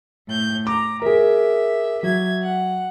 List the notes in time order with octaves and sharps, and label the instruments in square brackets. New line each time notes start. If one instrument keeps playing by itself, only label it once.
[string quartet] A2 G6
[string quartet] A#5 [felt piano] D6
[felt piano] G#4 A#4 [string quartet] E5
[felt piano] F#3 [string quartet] E5 G#6
[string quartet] F#5